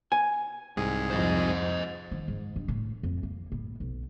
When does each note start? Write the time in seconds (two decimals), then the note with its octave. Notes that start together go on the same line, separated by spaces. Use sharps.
0.12 G#5
0.76 C2 G#2 G#4
1.11 F2 C5 D#5
2.11 D#3
2.28 G#2
2.56 G2
2.68 A2
3.03 F2
3.23 A#3
3.52 A2
3.80 B1